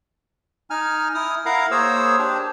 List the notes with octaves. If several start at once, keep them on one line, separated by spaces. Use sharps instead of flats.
D#4 G#5 F6
E4 D#6 F6
E4 A#4 F5 F#5 A#5
A#3 G#4 C5 C#5 E6
D4 G4